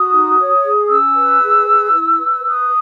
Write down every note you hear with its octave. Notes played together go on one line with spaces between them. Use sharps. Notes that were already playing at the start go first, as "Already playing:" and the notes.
Already playing: F#4 D#6
D#4
C#5
G#4
C#4 E6
B4
G#4
B4
E4
B4
B4 D#6